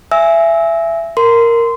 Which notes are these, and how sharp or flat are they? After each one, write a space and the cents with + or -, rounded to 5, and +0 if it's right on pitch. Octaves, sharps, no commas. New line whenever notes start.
E5 +20 G#5 +0 E6 -25
A#4 -5 C6 -20